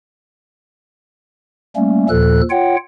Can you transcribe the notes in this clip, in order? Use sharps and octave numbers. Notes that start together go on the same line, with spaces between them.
G3 A3 A#3 C#4
D#2 A#2 F3 A4 F#6
F4 C#5 F#5 G5